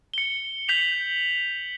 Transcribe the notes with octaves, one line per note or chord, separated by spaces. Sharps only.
C#7 G7
G6 B6 C#7 F7 F#7